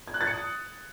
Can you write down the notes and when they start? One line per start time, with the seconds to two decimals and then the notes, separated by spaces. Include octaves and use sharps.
0.08 G#6
0.14 F#6
0.21 A6
0.27 C#7
0.34 D#6